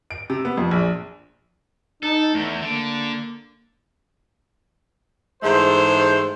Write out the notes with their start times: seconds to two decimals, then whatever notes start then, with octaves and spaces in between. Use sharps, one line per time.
0.11 D7
0.30 C3
0.45 B3
0.57 F2
0.71 A#1
2.03 D#4 A4
2.34 E2 A3
2.62 D3 A#3
5.42 G#2 E3 G#3 A3 C5